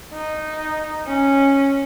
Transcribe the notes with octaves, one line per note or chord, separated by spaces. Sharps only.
D#4
C#4